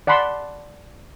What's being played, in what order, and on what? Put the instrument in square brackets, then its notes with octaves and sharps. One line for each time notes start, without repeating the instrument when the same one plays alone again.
[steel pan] D5 F#5 A5 B5 C6